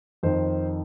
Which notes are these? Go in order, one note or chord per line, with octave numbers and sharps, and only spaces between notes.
F2 D#3 C5